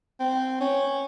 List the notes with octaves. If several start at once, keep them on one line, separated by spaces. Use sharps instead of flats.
C4
C#4